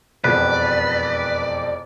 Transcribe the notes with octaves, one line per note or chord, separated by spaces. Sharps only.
E1 F2 B4 D5